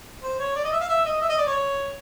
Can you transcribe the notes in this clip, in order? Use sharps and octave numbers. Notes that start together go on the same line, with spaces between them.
C5
C#5
D5
D#5
E5
F5
E5
D#5
E5
D#5
D5
C#5